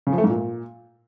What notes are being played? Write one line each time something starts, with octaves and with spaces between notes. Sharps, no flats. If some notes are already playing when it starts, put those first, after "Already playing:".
C#3
F3
A3
G#2
A#2